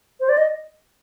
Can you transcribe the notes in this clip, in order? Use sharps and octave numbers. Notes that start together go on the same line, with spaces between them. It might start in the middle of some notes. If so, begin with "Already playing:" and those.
C5
D5
D#5